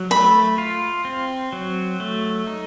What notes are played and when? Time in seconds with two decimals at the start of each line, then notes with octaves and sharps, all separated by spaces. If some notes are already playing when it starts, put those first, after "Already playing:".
Already playing: F#3
0.10 A3 B5
0.58 F4
1.05 C4
1.53 F#3
2.00 A3
2.47 D#4